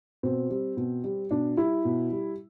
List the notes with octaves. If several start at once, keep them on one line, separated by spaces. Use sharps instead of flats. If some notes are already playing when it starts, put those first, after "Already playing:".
B2 C4
G3
B2
G3
B2 D4
G3 E4
B2
G3